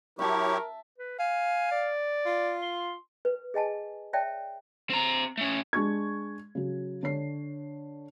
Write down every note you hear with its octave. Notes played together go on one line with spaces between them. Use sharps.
F#3 E4 G4 A#4 E5 A5 C#6
B4
F5 G#5
D5
F4
C6
B4
G#4 D#5 G#5 A5
C#5 D5 E5 G5 A5
C4 A#5
A3 C#4
G#3 D4 C#6 G#6
C#3 F#3
D3 C#5 C7